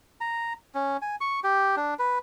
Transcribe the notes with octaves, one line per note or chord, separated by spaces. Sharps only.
A#5
C#4
G#5
C#6
G4
D4
B4